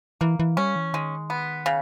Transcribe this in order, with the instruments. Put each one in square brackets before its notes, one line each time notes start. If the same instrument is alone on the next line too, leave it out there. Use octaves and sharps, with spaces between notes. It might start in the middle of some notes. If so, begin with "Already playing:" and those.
[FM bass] E3 [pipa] A#3
[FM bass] E3
[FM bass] G3 [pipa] C#4
[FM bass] E3
[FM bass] D#3 [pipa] G#3
[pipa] B3
C#3